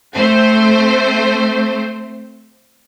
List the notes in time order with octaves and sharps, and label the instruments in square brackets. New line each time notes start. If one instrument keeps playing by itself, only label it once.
[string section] A3 C4 C5